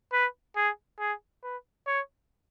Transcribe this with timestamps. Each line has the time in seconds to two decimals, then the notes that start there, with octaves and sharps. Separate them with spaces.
0.13 B4
0.56 G#4
1.00 G#4
1.44 B4
1.87 C#5